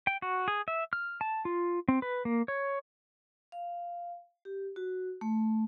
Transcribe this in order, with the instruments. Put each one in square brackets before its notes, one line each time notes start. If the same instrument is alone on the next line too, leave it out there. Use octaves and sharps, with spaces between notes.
[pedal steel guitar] G5
F#4
G#4
E5
F6
A5
F4
C4
B4
A#3
C#5
[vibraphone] F5
G4
F#4
A3